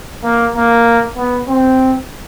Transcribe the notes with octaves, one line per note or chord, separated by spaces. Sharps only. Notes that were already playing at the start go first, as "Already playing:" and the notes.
A#3
A#3
B3
C4